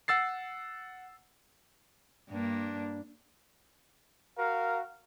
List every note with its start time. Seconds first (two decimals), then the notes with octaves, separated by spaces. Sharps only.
0.08 F#5 E6 A6 C7
2.30 G2 A#3 D4
4.38 F#4 A#4 F5